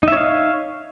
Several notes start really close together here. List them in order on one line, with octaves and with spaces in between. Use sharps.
D#4 E5 C#5 F5